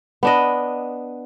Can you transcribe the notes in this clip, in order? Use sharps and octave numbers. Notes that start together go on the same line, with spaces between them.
B3 D4 D#5